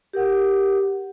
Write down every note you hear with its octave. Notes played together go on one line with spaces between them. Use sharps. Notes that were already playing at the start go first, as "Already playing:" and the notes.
G4 A#4 F#5